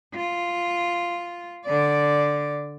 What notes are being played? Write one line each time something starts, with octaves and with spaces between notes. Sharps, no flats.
F4
D3 D5